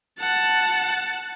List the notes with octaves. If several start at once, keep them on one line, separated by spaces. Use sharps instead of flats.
F#5 A5